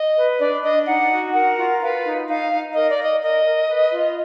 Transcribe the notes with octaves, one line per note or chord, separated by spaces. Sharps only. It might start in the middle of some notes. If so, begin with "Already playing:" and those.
Already playing: D#5
B4
D4 D5
D4 D#5
D#4 F#5
F#4
A#4 F#5
F4
B4 F5
D#4
D#4 F5
D#4
A#4 D#5
D5
A#4 D#5
A#4 D#5
A#4
B4
F4